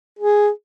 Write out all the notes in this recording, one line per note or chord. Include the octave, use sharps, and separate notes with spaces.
G#4